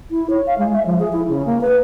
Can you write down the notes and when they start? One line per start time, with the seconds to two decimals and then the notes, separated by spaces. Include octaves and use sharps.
0.10 E4
0.29 C#5
0.46 F5
0.58 G#3
0.73 E5
0.85 F3
0.99 G#4
1.12 E4
1.27 C#3
1.45 A#3
1.61 B4